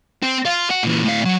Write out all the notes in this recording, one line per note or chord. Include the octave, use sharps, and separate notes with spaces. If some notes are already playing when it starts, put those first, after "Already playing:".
C4
F4
F#4
A#2 E3
A2 F5
F#3